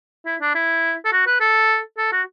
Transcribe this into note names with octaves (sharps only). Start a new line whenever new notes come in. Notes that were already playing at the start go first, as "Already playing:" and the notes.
E4
D4
E4
A4
F#4
B4
A4
A4
F#4